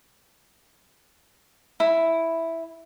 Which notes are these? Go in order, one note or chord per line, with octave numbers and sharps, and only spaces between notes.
E4